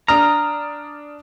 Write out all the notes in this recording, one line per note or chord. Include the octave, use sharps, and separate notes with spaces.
D4 A#5 D#6 F6